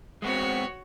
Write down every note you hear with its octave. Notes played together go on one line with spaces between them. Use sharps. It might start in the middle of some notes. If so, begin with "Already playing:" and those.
G#3 B3 C4 F#4 C#5